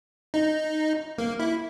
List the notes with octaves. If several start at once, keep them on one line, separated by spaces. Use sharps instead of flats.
D#4
A#3
E4